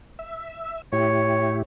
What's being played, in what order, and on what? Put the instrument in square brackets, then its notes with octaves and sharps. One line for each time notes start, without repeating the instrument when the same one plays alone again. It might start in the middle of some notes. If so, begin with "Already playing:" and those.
[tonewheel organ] E5
[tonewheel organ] A2 E4 G4 [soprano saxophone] C#5